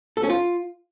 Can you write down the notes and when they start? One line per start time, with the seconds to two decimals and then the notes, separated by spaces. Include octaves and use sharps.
0.17 A4
0.23 C#4
0.30 F4